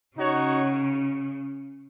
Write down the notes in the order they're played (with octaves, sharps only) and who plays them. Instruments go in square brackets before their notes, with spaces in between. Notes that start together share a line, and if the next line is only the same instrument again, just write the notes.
[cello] C#3 [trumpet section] D#4 F#4 C#5